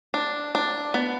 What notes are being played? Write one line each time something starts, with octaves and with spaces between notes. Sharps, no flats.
D4
D4
B3